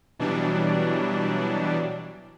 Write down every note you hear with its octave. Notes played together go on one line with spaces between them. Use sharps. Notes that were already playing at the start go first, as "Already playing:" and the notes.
B2 E3 F#3 G3 D4